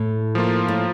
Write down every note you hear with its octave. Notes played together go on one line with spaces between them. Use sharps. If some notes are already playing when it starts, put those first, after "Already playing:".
Already playing: A2
F3 A#3 F4
A2